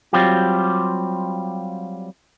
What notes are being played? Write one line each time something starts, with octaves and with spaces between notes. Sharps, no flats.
F#3 G3 C4 F4 G4